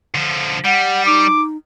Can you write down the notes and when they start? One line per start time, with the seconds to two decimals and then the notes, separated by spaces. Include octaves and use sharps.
0.15 D3 F3
0.65 G3 F#5
1.06 D#4 D6